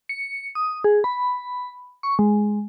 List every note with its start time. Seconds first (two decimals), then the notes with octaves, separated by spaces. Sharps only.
0.09 C#7
0.55 D#6
0.84 G#4
1.04 B5
2.03 C#6
2.19 G#3